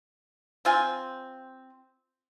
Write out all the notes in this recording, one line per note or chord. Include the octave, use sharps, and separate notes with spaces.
C4 F4 G#5